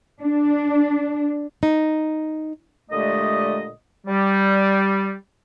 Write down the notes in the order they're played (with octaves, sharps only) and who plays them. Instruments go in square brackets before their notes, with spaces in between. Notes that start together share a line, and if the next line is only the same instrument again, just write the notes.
[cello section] D4
[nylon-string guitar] D#4
[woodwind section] A#2 D3 G#3 A3 G4 D#5
G3